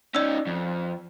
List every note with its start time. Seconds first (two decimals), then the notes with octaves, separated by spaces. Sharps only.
0.15 C#4 D#4 D5 E6
0.47 F2